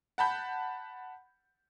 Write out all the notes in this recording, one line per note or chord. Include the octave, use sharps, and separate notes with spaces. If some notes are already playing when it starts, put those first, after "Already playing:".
F#5 A5 B5 G6